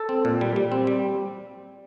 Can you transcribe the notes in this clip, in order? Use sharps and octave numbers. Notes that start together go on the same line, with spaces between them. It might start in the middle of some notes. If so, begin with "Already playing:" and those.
Already playing: A4
C4
A#2
G3
G3
C4
G3